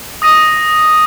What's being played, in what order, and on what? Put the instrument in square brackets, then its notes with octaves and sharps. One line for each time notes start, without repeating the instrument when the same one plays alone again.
[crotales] D#6 A#6 D#7